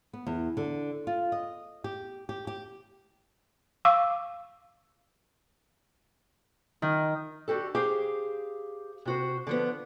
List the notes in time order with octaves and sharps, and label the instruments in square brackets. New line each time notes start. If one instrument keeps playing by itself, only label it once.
[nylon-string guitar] B3
E2
D3
F4
D#5
G4
G4
G4
[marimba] F5 C#6 D6 E6
[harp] D#3
[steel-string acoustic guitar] D4 F#4 G4 A4
G4 G#4 C5 F5
C3 F#4 C5
D3 F3 B3